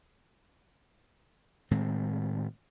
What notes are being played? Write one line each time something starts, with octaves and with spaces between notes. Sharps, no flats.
A2 D#3 G#3 C4